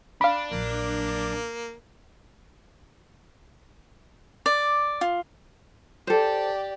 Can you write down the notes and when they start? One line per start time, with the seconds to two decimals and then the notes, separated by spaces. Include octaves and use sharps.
0.21 D4 F5 B5
0.52 A#1 F#3 A#3
4.46 D5
5.01 F4
6.07 G4 A4 C5 D5